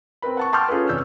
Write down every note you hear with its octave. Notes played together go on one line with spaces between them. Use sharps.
C4 A#4 B4 B5
F#5 A5 C#6
G5 A5 C6 D6 F6 G6
C#4 F4 G#4 A4 B4
F1 C#4 D5 E6 G6